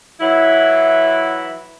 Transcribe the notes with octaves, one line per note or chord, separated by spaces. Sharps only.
E3 F#3 E4